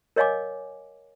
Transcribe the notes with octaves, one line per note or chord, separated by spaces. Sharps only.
A#4 C#5 D#5 F5 G#5 D6